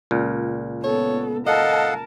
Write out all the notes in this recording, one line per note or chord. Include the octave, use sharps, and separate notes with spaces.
C#2 A#2
B3 A4 C#5
A4 A#4 D#5 F5 F#5 A5